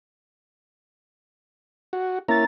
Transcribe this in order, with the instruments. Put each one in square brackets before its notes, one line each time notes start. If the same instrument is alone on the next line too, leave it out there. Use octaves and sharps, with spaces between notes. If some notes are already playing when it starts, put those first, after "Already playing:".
[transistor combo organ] F#4
[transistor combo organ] A#3 C#4 E4 [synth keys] A#5 A6